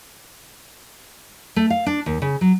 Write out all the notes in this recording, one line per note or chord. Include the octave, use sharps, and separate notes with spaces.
A3
F5
D4
D#2
C#3
F#3